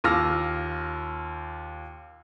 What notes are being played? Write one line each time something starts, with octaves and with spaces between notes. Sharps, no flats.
D#2 F4 D6 E6 F6 A#6